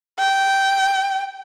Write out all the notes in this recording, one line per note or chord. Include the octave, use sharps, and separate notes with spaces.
G5